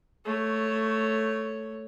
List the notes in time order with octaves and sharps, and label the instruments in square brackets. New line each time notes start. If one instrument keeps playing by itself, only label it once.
[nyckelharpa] A3 C#5